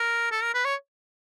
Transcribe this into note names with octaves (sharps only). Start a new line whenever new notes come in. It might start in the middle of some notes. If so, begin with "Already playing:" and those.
Already playing: A#4
A4
A#4
B4
C#5